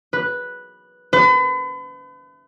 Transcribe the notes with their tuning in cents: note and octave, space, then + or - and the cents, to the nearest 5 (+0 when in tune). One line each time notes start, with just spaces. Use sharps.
B4 -5
B4 +40